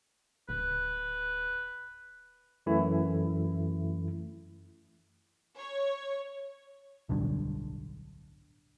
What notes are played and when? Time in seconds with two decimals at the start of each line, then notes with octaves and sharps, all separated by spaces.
0.49 D1 B4
2.66 F#2 E3 A3 E4
5.58 C#5
7.09 D1 B1 G2 D3